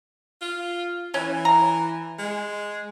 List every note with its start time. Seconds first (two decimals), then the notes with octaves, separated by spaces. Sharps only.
0.41 F4
1.14 E3 C#4
1.45 A#5
2.18 G#3